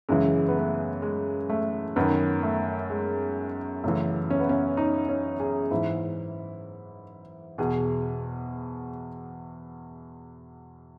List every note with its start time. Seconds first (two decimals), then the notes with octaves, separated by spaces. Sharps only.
0.09 F#2 C#3 E3 G#3
0.48 B3
0.56 A3
1.02 G#3
1.50 A3
1.96 F#2 D#3 B3
2.43 A3
2.90 G#3
3.84 F#2 C#3 E3 A3
4.30 C#4
4.40 B3
4.49 C#4
4.77 D#4
5.09 C#4
5.40 G#4
5.71 G#2 E3 E4
7.58 E2 B2 G#4